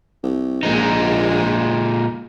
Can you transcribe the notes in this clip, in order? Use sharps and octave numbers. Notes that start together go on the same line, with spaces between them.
C2
A#1 A#2 G#3 D#4